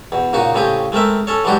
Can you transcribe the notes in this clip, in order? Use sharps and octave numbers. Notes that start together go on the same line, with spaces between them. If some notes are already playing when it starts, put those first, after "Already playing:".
E2 B2
A#2 C#3 D#4 F#4
A2 C#3 C4 G4 G#4
G#3 A3 C4 A#4 E5
C#4 A4 C#5
E3 F#3 G#3 D4 F#4 G4